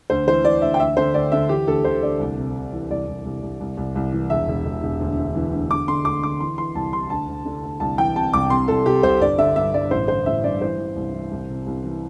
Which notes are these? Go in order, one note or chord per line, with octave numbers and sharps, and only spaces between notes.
D2 C5
E3 C5
E3 D5
D2 E5
G5
D2 E5
D3 C5
D2 D5
D3 E5
E3 G4
D2 A4
D2 C5
D2 D5
C2
C3
C3
E3
C2 D5
C2
C2
C2
C2
C2
C2
E3
E1 E5
E1
E1
E1
D2
D2
E3
D2
D2 D6
D3 C6
D2 D6
D3 D6
E3 C6
E3 C6
C2 A5
C3 C6
D2 A5
D2
D3
D2
C2 A5
E3 G5
C3 A5
C2 D6
C3 C6
C2 A4
C3 G4
C2 C5
G1 D5
D3 E5
G2 E5
G2 D5
A1 C5
D3 C5
A1 E5
G2 D5
E3 C5
E3
C2
E3
C2
C3
C2
E3